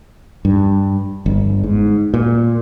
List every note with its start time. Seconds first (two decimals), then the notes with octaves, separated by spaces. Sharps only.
0.45 G2
1.26 G1
1.64 G#2
2.14 A#2